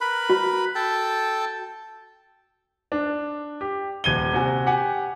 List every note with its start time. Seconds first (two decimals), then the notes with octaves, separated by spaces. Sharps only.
0.01 A#4 B4 B5
0.30 F#4
0.75 A4 G5 A5
2.92 D4
3.61 G4
4.04 D#1 G#6 D#7 G7
4.33 C3 F#4 G#5
4.66 G4 F#5 G#5